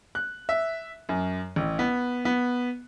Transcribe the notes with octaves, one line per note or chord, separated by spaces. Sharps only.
F#6
E5
F#2
A1
B3
B3